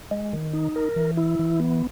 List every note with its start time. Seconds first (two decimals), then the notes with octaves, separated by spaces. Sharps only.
0.11 G#3
0.33 D#3
0.53 D#4
0.76 A#4
0.96 E3
1.17 E4
1.39 E3
1.60 B3